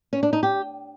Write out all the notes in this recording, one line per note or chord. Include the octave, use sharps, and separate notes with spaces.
C#4
D4
D#4
G4